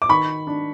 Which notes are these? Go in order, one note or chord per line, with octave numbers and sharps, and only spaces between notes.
D6
D#3 B5 C#6
D4